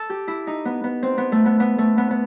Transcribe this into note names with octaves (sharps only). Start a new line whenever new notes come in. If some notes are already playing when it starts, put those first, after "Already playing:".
Already playing: A4
G4
E4
D#4
B3
B3
C4
B3
A3
B3
B3
A3
B3
B3